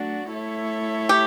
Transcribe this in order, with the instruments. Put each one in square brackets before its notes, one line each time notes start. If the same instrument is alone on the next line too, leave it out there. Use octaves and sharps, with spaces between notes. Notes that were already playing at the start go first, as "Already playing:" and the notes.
Already playing: [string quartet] F#3 A3 D4 F#4
A3 E4 A4 C#5 E5
[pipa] G4